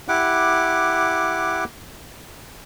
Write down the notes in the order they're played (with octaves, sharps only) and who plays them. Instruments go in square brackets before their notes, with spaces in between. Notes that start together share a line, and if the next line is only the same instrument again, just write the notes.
[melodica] E4 G4 F#5 D6